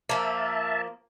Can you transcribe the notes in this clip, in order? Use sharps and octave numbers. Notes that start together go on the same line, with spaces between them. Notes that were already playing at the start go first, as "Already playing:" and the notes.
F3 A#3 E5 A5